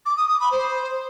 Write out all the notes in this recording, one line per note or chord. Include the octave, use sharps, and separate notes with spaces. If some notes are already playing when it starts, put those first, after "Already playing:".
D6
D#6
D#6
B5
C5